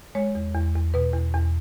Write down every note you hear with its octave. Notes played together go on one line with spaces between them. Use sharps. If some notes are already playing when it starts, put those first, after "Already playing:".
G#3 C#5
E2
E2
E2
B2 B4
E2
E2